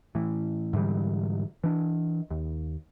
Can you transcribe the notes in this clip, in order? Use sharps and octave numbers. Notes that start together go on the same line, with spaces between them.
A2 E3
G#2 D3 E3 G3
E3 D4
D#2